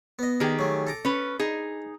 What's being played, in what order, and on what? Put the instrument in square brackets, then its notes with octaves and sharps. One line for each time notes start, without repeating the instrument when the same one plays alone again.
[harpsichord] B3 D#5
[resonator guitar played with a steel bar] D#3 G4 G#4
[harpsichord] F#3 A3
A4 A#5 D6
[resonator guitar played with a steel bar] C#4 B4
D#4 G#4